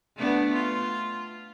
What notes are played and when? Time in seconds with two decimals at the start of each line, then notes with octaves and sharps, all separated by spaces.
0.17 A3 B3 D4
0.53 F4